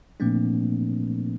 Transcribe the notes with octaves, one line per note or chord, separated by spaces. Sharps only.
A#2 F3 A3 A#3 C4 D4